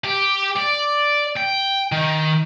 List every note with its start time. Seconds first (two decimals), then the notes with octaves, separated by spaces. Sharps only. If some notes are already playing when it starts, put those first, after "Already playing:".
0.04 G4
0.56 D5
1.37 G5
1.92 D#3